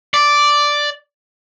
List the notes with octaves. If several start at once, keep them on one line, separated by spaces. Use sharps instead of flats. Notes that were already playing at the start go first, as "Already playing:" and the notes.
D5